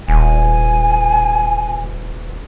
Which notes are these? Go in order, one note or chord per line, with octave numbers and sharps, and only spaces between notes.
D#1 G#5